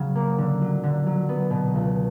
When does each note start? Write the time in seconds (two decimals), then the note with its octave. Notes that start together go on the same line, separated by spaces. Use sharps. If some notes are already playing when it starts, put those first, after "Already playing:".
Already playing: C#3 F#3
0.15 A#3
0.38 D3
0.61 F#3
0.84 D3
1.06 F#3
1.29 B3
1.50 B2
1.74 C#2